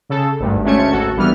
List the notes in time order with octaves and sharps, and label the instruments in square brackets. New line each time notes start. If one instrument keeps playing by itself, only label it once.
[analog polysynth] C#3 A4
G#1 D2 G2
D2 G#3 A3 C#4 G#6 C#7
G#1 F#4 A4
A#1 E3 G3 B3 F6